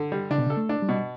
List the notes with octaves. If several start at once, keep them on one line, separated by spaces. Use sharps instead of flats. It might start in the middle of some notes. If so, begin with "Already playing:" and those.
Already playing: D3
G3
C#3 D4
B2
C#3
A4
A3
D4
G3
B2